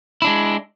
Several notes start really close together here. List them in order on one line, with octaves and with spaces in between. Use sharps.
E4 D4 G#3